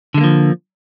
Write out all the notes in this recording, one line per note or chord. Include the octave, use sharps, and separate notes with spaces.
D3 F3 G#3 A#3